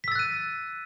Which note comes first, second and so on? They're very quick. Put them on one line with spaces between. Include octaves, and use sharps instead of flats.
B6 E6 A6 F#6 D#7